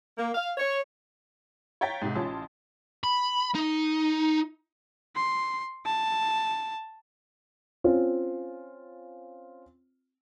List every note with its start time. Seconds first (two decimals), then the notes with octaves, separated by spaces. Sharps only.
0.18 A#3
0.34 F5
0.57 C#5
1.81 C#5 F5 G5 A#5 A6 B6
2.02 G#2 C3
2.15 A1 C#4 F4 A5 C6
3.03 B5
3.55 D#4
5.15 C6
5.86 A5
7.84 C4 C#4 F4